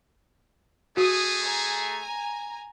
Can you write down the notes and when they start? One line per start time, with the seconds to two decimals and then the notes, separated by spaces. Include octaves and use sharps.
0.97 A3 F#4 G#4 D#6
1.44 G#5 A#5